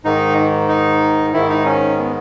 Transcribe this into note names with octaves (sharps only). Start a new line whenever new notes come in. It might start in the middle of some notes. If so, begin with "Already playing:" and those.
G#2 D#3 D#4
D#4
G#2 D#3 E4
D#4
C#4
B3